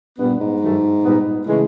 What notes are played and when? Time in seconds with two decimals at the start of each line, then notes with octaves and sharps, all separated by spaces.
0.19 G2 A#2 G3 B3
0.40 G#2
0.62 G2 D#3 F#3 A3
1.04 A#2 G3 B3 D#4
1.46 A2 C#3 E3 G#3